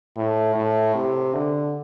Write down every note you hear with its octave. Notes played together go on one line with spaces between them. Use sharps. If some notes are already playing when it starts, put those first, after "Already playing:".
A2
A2
C3
D3